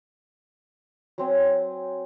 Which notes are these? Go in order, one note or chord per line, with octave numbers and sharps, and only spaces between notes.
F#3 C4 G#5 D#6